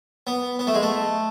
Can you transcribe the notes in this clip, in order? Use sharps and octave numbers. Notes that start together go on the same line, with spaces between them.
B3
B3
A3
G#3
A3